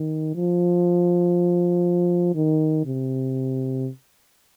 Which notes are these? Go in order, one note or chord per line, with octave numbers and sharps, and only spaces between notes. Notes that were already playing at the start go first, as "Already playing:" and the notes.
Already playing: D#3
F3
D#3
C3